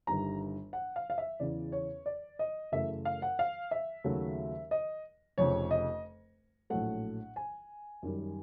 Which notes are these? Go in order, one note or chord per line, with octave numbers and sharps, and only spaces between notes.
G1 G2 D#3 G3 A#5
F#5
F5
F5
E5
E2 C#3 E3 D5
C#5
D5
D#5
F#2 C#3 E3 A3 E5
F5
F#5
F5
E5
D#2 C#3 F#3 A3
D#5
F1 F2 C#3 C#5
D#5
A#1 A2 F#3 A3 F#5
G#5
F#2 D#3 G3